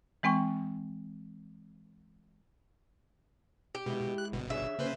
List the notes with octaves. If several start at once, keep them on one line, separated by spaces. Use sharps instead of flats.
E3 G#3 C4 G5 C#6
G4
B2 G#3 E4
F#6
G1 B2
D4 G#4 C#5 E5
C#3 A#3 C#4 B4 C5